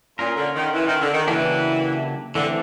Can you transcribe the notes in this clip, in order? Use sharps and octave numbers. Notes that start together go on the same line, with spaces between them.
A#2 C#4 F4 A#4
D3
D#3
E3
D#3
D3
D#3
C#3 E3 F#3 A#3 D4 G4
D3 E3 A3 C4